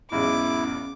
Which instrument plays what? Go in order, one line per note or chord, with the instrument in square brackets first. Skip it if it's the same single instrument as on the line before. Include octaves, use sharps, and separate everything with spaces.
[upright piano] B1 E2 G#2 [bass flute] C#4 [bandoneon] E4 [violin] D6